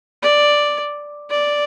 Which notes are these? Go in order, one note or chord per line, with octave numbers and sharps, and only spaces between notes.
D5
D5